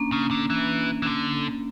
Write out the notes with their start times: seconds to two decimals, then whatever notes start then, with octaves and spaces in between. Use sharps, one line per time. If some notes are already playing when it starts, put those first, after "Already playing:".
Already playing: A#3 C#4 D4
0.12 C#3
0.31 D3
0.50 E3
1.02 E3
1.06 D3